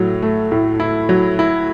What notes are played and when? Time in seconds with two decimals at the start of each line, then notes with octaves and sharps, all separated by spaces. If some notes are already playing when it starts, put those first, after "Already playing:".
Already playing: A2 F#3
0.22 A3
0.52 A2
0.80 E4
1.09 F#3
1.39 E4